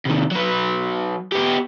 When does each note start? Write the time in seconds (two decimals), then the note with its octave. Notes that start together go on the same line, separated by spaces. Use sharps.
0.06 C3 D#3
0.31 F#3 B4
1.32 B3 G4